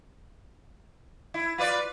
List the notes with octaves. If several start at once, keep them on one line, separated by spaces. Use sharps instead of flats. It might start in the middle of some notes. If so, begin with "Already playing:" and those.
E4
F4 B4 D5